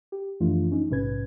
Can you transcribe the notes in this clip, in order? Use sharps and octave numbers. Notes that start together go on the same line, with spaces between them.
G4
F#2 E3 F3 A3 D4 F4
C#4 D#4
A#1 G#2 C3 C#4 B4 G#6